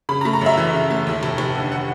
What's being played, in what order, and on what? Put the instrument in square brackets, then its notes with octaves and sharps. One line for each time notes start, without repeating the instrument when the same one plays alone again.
[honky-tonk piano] C#3 B5
A#5
A3
A#5
F#2 E5
E3
C#3
A3
D#2
F1
F1
D3
F#5